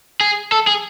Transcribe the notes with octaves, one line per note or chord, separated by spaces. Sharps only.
G#4
A4
G#4